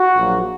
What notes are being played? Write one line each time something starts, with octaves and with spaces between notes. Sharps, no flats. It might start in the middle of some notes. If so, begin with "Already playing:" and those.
Already playing: F#4
A#1 A#2 F#3 A#3